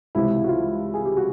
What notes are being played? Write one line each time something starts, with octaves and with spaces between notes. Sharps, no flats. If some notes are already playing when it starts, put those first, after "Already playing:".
C#2 C3 E3 E4
F#4
F4
G#4
G4
F#4